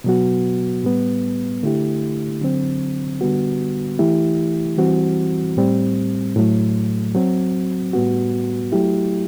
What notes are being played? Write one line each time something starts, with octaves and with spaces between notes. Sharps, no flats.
B2 F#3 B3 F#4
A2 G3 B3
D3 A3 E4 G4
D3 F#3 C4
D3 G3 B3 F#4
E3 A3 E4 G4
E3 G3 C4 F#4
A2 G3 C4
A2 F#3 A3
F#3 C4 F#4
A2 G3 B3 F#4
F#3 A3 E4 G4